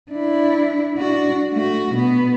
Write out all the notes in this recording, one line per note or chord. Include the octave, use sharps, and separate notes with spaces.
D4 E4
D4 F#4
A3 F#4
B2 B3